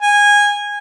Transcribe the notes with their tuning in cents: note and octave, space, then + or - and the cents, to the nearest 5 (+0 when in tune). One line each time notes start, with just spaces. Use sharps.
G#5 -15